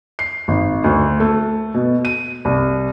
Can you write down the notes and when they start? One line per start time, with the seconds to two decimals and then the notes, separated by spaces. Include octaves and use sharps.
0.19 C7
0.48 G#1
0.84 D2
1.20 A3
1.74 B2
2.05 D#7
2.45 C2